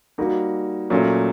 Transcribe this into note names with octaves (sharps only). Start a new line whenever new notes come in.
G3 A#3 D#4 F#4
A#2 F#3 A3 C#4